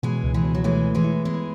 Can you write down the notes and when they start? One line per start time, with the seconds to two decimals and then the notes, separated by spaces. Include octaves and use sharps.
0.03 B2 E3 G#3
0.24 C#2
0.34 E3 G#3
0.44 B2
0.55 F#3
0.64 E3 G#3 A3
0.84 A3
0.95 E3 G#3
1.04 E4
1.25 E3 G#3 B3